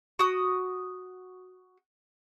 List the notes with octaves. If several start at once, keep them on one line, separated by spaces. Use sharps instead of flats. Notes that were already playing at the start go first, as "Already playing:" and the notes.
F#4 D#6